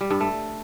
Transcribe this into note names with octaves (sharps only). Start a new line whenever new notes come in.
G3
G2
A3